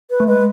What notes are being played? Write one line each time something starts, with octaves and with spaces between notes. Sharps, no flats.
B4
A3
G#3 B4